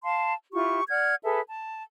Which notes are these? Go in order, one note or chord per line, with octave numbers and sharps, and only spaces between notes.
F5 A5 C6
E4 F4 G4 C#6
D5 F#5 F6 G#6
G#4 A4 B4 E5
A5